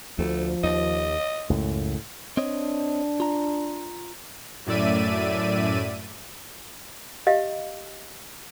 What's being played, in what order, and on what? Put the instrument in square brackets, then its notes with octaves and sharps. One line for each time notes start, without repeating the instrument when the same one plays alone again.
[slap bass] D2 [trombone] F3 [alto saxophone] A3
[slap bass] D#2 [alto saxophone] D#5
[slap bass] C#2 F#2 [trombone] A2
[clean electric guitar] C4 C#5 D#5 [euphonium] D4
[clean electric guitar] F4 A#5
[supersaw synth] F#2 A2 D5 E5 D#7
[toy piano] G4 D#5 F5